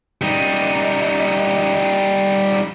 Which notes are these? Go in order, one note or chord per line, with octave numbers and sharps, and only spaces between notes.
G3 D#4